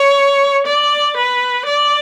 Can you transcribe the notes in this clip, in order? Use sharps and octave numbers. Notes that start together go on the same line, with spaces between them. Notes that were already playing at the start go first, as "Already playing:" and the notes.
Already playing: C#5
D5
B4
D5